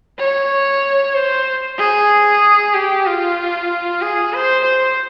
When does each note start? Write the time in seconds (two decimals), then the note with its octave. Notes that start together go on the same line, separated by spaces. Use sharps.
0.19 C#5
1.15 C5
1.78 G#4
2.74 G4
3.06 F4
4.01 G#4
4.34 C5
4.65 C5